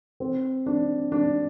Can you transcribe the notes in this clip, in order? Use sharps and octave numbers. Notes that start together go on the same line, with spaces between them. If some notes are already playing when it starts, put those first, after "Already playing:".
C4
D4
D4